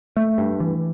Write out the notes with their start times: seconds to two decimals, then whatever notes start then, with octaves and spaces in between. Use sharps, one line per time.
0.17 A3
0.38 G2
0.60 E3